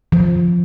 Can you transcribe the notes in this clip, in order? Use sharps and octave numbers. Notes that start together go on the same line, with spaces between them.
F3